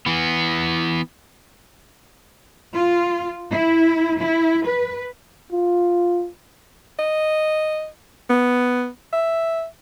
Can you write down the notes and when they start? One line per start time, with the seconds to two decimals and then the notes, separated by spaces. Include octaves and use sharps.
0.06 E3 B3
2.74 F4
3.51 E4
4.19 E4
4.67 B4
5.52 F4
6.99 D#5
8.30 B3
9.13 E5